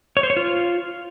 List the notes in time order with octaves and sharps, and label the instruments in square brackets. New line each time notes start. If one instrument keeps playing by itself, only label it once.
[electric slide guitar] C#5
C5
C#5
F4